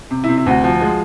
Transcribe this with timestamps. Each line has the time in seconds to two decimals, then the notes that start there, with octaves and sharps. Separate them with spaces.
0.11 C3
0.24 E4
0.28 C3
0.37 E4
0.46 D2 F#4
0.64 F3 F#4
0.81 G#3